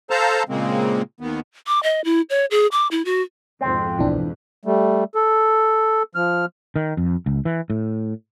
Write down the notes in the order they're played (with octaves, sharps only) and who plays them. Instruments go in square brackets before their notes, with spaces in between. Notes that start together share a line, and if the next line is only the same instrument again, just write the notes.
[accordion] A4 C5 F5 A5 A#5
A#2 C#3 G#3 A#3 C4
D#2 D#3 B3
[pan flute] D6
D#5
E4
C#5
G#4
D6
E4
F#4
[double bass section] F2 G#2 B2 [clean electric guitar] C4
[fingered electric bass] D1 B1 [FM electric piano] E3 D4
[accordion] G3 A3
A4
F3 F6
[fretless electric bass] D#3
F2
C#2
E3
A2